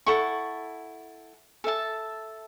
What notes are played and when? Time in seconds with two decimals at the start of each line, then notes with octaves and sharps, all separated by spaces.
0.06 E4 A4 F#5 C#6
1.64 A4 E5 A5